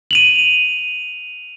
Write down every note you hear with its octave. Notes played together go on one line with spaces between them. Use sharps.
D#7 F7 F#7